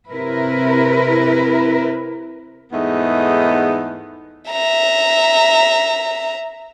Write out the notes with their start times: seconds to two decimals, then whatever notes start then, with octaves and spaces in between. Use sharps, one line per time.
0.11 C3 E4 A#4 B4
2.73 E2 G#2 A3 B3 D#4 D#5
4.51 E5 A#5